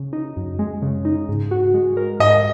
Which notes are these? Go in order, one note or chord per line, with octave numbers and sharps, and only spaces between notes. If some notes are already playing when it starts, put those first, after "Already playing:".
Already playing: C#3
D#4
F#2
G#3
C#3
D#4
G#2
F#4
G#3
A#4
G#2 D#5